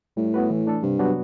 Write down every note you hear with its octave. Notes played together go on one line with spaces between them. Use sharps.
A2 G3
B3 F#4 B4
E3
A3 D4 A4
G2 C3
F#3 B3 D4 F#4